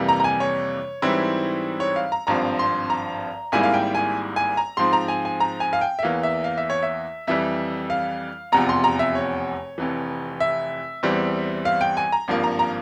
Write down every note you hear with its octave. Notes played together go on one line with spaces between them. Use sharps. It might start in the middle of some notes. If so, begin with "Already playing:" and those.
Already playing: F2 C3 E3 G3 A#3
A#5
A#5
G#5
C#5
G#2 E3 G3 C4 E4
C#5
F5
A#5
G#1 G2 F3 C4 A#5
C6
A#5
G#1 G#2 G3 A#3 E4 G#5
F5
G5
G#5
G#5
A#5
G#2 F3 C4 C6
A#5
G#5
G#5
A#5
G#5
F5
G5
E5
E2 E3 A#3 F5
E5
F5
E5
C#5
E5
F2 E3 G3 E5
F5
F1 E2 C3 F3 A#5
C6
A#5
E5
C#5
F1 F2 E3
E5
E2 E3 G3 C4
F5
G5
G#5
A#5
G#1 G2 F3 A#3
A#5
A#5